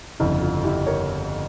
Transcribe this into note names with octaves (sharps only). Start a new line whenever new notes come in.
G1 F2 C#3 E4
F4
E4 G4
A#4 C#5